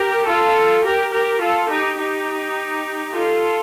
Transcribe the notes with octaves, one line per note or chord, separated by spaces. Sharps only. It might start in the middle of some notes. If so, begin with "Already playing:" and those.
Already playing: G4 A#4
F4 A4
G4 A#4
G4 A#4
F4 A4
D#4 G4
D#4 G4
F4 A4